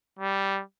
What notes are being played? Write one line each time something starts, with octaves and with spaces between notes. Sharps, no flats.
G3